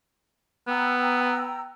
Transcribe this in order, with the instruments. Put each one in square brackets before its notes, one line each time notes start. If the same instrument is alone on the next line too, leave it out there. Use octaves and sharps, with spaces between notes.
[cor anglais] B3 [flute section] G5 A#5 E6